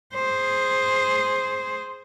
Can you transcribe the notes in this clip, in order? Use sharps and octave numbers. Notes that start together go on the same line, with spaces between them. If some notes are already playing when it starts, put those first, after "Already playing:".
G#4 C5